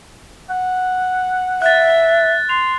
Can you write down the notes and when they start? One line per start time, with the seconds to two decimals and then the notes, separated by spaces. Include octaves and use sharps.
0.50 F#5
1.62 E5 F#6 A6
2.49 C6 F7